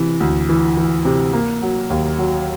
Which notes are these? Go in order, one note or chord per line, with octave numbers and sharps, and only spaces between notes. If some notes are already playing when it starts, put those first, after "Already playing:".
Already playing: C3 E3
D2
E3
E3
C3
A#3
F#3
D#2
F#3